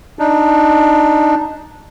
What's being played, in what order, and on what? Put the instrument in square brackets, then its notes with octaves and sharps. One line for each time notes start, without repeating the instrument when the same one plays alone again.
[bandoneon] D4 D#4